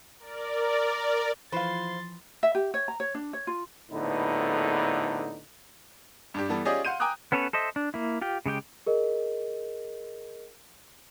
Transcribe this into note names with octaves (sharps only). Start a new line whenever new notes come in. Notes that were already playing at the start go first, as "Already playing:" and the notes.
A#4 D5
E3 F3 B4 C5 F5 C6 A6
E5
G4
C#5
A#5
C#5
D4
C#5
F4
A#1 A2 D3 B3 D#4 B4
G2 D4 G4
E3 G3 B3 A4
C#4 F4 G4 G#4 D5 D#5
F5 F#5 C6 G6 D#7
G5 G#5 A#5 D6 D#6 F#6
B3 C#4 A4 B4 C#5
A4 C5 D#5 E5
D4
A#3 E4
F4 G4 G5
C#3 G#3 G4 G5
G#4 A#4 D#5